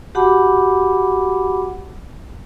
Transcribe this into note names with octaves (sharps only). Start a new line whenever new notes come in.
F#4 G4 F#5 A5 B5 D6